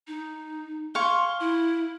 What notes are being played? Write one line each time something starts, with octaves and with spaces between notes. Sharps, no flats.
D#4
F5 G#5 C6 C#6
E4